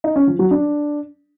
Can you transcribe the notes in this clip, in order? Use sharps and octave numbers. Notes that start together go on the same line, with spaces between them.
D#4
C#4
F3
F#3
D4